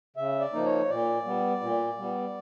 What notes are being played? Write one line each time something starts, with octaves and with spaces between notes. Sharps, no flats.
C#3 E5
D5
F3 A#3 D#4
C#5
A#2 D5
G3 B3
A#2
G3 B3